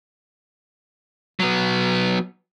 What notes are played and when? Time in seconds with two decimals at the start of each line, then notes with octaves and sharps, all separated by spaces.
1.40 F#3 B3